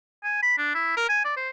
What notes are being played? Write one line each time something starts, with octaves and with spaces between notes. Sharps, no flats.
G#5
B5
D4
E4
A#4
G#5
D5
C5